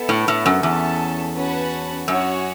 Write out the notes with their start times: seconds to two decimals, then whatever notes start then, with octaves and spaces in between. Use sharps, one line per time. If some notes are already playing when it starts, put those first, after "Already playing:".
Already playing: B3 E4 A4 E5
0.09 A2
0.28 A2
0.46 F#2
0.63 E2 C#4 A4 E5 A5
1.36 C#4 F#4 B4 F#5 A5
2.08 F#2 C#4 F#4 C#5